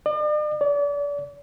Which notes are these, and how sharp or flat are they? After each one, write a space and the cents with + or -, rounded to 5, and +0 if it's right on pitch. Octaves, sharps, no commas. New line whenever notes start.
D5 +45
D5 -35